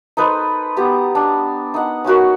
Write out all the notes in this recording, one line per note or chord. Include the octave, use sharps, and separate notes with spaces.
D#4 A4 B4 C5
B3 G4 A#5
D4
D#4 F#5
C#4 D#4 F#4 A#4